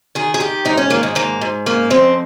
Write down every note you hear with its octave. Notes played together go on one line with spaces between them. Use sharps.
D#3 G#4
G#4
D#3 G4
G#2 D#4
C#4
D#3 A#3
G#3
G#2 A#3
G#2
C#3 A#3
F2 C4